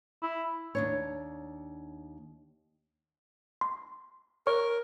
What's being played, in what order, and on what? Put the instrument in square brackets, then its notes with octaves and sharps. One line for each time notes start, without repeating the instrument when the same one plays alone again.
[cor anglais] E4
[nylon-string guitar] D#2 D4 C#5
[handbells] C6
[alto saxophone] A#4 [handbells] C#5 C#6